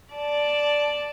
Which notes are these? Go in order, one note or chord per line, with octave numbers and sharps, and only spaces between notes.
D5 A5